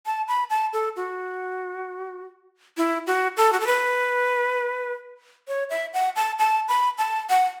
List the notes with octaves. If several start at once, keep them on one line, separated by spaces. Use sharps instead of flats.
A5
B5
A5
A4
F#4
E4
F#4
A4
F#4
A4
B4
C#5
E5
F#5
A5
A5
B5
A5
F#5